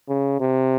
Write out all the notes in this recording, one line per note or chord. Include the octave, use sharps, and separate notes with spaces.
C#3
C3